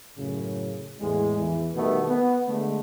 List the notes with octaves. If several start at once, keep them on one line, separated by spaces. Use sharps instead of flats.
F#2 A2 C#3
E2 A2 G#3
E2 E3
B2 D#3 G3 A3 B3
B3
D3 G#3 A3